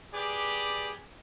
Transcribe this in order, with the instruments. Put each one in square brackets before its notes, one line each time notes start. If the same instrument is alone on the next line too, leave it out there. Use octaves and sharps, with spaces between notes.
[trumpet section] G4 G#4 B4 D5